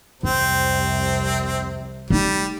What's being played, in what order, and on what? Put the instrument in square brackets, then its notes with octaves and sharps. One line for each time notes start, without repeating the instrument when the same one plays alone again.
[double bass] C2 C3 [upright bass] F2 [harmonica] C4
[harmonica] G3 [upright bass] A3 D#4